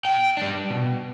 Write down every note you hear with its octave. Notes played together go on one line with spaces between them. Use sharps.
B2 G5
G3 D4
B2